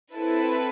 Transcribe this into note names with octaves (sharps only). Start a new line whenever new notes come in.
C4 E4 A4 B4